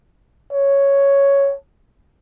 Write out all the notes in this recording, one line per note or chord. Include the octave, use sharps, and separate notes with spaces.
C#5